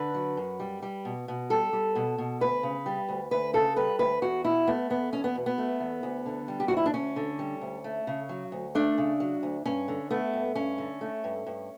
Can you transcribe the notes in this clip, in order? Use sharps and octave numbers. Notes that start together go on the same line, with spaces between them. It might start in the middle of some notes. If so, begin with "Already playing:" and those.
Already playing: D3 B4
F#3
F#2
G3
G3
B2
B2
G3 A4
G3
B2
B2
D2 B4
C#3
G3
D2
D2 B4
C#3 A4
G3 B4
D2 B4
E2 F#4
B2 E4
A3 B3
E2 B3
E2 C#4
B3
B2
B3
A3
E2
D2
D3
G3
G4
D2 F#4
E4
D4
D2 C#4
D3
G3
D2
A3
C#3
F#3
D2
A3 D4
C#3
F#3
D2
G2 C#4
D3
A3 B3
G2
G2 C#4
D3
A3
G2
G2